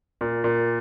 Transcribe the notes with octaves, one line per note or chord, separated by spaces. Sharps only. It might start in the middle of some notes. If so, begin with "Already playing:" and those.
A#2
A#2